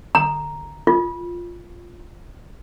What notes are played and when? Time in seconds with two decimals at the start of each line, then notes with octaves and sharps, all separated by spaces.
0.15 A#5
0.87 F4